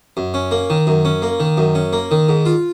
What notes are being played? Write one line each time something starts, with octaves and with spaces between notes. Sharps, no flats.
F#2
C#4
A#3
D#3
F#2
C#4
A#3
D#3
F#2
C#4
A#3
D#3
G#2
F4